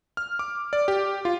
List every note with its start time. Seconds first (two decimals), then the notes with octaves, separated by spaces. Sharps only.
0.17 F6
0.39 D6
0.73 D5
0.88 G4
1.25 F4